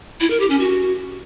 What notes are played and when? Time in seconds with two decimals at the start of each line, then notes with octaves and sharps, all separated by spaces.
0.21 E4
0.30 A#4
0.40 G4
0.50 C#4
0.59 F#4